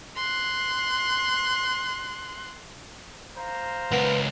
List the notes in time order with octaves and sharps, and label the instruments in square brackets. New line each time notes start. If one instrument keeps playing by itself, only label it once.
[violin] C6 F#6
[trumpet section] C5 F5 A#5
[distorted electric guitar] C#2 A#4 [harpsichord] B3